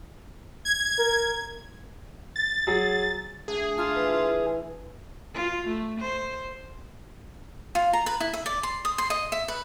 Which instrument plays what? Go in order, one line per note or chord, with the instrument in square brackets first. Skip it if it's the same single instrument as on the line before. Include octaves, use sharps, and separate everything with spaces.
[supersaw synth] G#6
[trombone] A#4
[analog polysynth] A6
[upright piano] F#3 G#4
[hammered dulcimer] D3 A3 [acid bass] G#4
[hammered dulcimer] D4 E5 B5 [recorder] F4
[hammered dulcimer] E3 [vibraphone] B4
[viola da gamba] F4
A3
C5
[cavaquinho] F4
A#5
B4
E4
E5
D5
C6
D#6
C6
D#5
E5
B4